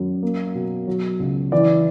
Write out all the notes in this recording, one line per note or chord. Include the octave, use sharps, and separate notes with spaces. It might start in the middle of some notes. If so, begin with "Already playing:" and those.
Already playing: F#2
A#3
B2
F#3
C#2
E3 D5